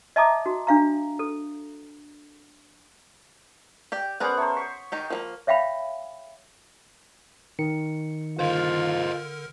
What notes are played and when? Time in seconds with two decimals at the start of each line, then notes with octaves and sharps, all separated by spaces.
0.16 D#5 E5 A5 A#5 D6 D#6
0.46 F#4
0.67 D4 F5 A#5
1.19 A4
3.92 G4 D5 G5
4.20 B3 C#4 G#4 A#4 C5 D5 F#6
4.37 C5 C#5 E5 A5 A#5
4.57 C#6 B6 C#7
4.92 D#3 D#4 G4
5.10 F3 G3 A#3 A#4
5.47 C#5 E5 F5 G5 B5
7.59 D#3 C#7
8.39 D3 F4 A#4 C5 D#5